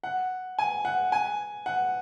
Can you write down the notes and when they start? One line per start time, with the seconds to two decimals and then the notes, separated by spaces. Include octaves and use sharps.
0.03 F#5
0.59 G#5
0.85 F#5
1.12 G#5
1.66 F#5